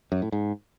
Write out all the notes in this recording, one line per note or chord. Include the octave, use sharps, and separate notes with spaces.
F#2
A2
G#2